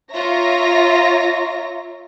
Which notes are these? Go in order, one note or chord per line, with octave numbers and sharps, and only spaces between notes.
F4 C#5 E5 A#5 A#6